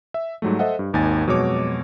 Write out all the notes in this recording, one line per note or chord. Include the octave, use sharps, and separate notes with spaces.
E5
G#2 F#3 G3 A3
A4 C5 D#5 E5 F#5
G2
G#1 D#2 D#4 G#5 A6
F2 B2 F#3 G#3 C#5 D6